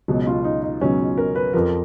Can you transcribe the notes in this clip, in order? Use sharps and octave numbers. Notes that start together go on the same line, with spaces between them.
C#2 B2 F#3
F4
D#4
D#4
C#2 B2 F#3 C#4
A#4
B4
F2 F3 A#4